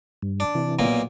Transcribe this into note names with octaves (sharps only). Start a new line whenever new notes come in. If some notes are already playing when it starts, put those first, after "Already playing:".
G2
D4
C3 E3
B1 A#2 A#3